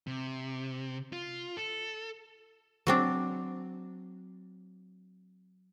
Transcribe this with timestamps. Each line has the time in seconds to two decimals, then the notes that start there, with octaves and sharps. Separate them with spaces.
0.07 C3
1.13 F4
1.57 A4
2.87 F#3 C4 D4